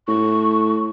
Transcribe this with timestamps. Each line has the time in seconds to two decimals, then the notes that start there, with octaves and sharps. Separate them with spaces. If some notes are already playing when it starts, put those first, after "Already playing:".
0.08 A2 C#6